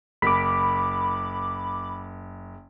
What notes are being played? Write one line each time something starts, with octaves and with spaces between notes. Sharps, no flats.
F#1 B5 D6